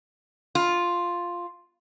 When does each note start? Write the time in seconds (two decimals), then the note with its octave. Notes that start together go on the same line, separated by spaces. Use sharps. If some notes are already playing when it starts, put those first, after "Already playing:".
0.55 F4